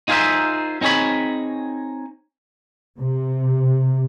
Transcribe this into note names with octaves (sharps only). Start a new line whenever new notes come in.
D#4 F4 G#4 A#4 C5 E5
C4 D#4 G#4 C#5 B5
C3